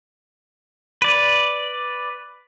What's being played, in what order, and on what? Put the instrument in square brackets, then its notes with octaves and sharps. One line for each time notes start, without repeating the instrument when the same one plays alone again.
[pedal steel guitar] B4 D5